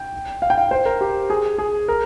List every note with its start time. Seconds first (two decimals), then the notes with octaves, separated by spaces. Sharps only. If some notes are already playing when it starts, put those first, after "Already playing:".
Already playing: G5
0.42 F5
0.50 G5
0.57 F5
0.71 C5
0.86 A#4
1.01 G4
1.30 G#4
1.58 G#4
1.88 A#4